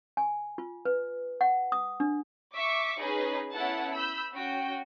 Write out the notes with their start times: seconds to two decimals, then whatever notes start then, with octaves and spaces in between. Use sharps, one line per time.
0.17 G#5
0.58 F4
0.85 B4
1.41 F#5
1.72 D#6
2.00 D4
2.52 E5 C#6 D6
3.00 C#4 D#4 G#4 B4
3.51 B3 C#4 E4 A4 F#5 A5
3.93 B5 E6 G6
4.33 C#4 F#4 G5